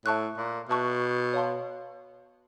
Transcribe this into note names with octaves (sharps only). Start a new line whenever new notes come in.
A2 E5 A5 C#6 F#6
A#2
B2 E5 A5 C#6 F#6
C#5 F5 A5 C6